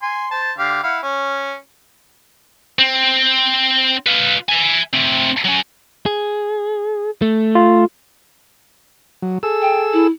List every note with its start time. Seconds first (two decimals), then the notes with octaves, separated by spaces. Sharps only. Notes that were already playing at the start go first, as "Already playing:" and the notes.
0.02 G#5 C6
0.31 C5 A5
0.58 D3 G4 F5
0.83 E4 F5 F#5
1.03 C#4
2.79 C4
4.06 F4 B4
4.49 E5 G#5
4.93 A3 C4
5.44 F#3 C#4
6.06 G#4
7.22 A3
7.55 F4
9.22 F#3
9.43 G#4 A4 E6
9.62 G5
9.93 E4